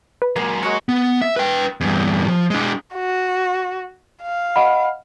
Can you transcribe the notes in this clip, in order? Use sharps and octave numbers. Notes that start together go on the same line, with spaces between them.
B4
F#3 G#3 A#3
G#3 F#4 A#4 C#5 F#5
B3
E5
B4 G5
E2 G2
F3
G#3 D4
F#4
F5
D#5 F#5 B5